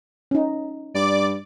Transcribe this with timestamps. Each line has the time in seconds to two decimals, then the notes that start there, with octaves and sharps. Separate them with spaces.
0.31 C#4 D#4
0.94 G2 D5 D6